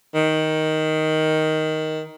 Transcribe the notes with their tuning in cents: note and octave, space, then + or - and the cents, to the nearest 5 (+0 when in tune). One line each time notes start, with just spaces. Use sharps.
D#3 +10